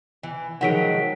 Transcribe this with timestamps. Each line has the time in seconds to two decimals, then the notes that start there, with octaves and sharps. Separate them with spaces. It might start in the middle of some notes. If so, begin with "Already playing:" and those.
0.23 E3
0.61 D#3 F3 F#3 G#3 F#5 B6 D7